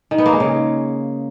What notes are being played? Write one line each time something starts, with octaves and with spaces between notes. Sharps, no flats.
D#3
B3
A#3
G#3
C#3